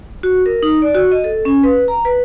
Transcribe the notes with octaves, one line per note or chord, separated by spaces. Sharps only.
F#4
A#4
D#4
D5
F#4
D#5
A4
C#4
B4
A#5
B4